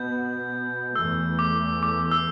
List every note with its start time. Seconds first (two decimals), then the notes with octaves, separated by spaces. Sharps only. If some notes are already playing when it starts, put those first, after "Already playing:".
Already playing: B2 B3 G6
0.95 E2 E3 A3 E6
1.39 D6
1.83 D6
2.11 E6